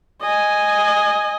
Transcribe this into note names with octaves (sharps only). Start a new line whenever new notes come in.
D#5 G#5